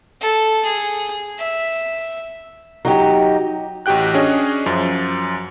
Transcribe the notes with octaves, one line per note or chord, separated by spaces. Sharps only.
A4
G#4
E5
F#3 D#4 G4
A1 F#4 G4 G5 F#6
C#4 D4 G#4 C#5 D#5
F#2 F3